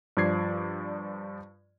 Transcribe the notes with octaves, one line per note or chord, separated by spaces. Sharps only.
G2 F3 D5 G#6 C7